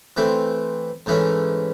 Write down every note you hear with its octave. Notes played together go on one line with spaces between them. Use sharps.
E3 A3 C4
G#2 E3 A3 C#4